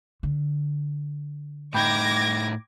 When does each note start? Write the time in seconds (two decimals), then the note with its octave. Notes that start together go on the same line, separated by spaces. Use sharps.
0.23 D3
1.74 A2 D#4 G5 B5 D6 G6 G#6 A#6